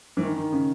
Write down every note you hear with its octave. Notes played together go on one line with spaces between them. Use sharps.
E3
D#3
D#3
C#3